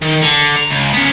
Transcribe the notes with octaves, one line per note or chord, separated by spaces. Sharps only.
D#3
D3
A#5
C#2
B3 C#4